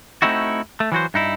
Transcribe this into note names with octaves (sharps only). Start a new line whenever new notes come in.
A3 C4 D#4 E4 F#4
A3
E3 F#3 F#4 C5
G2 D#4 E4